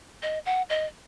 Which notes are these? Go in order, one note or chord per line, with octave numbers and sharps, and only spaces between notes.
D#5
F#5
D#5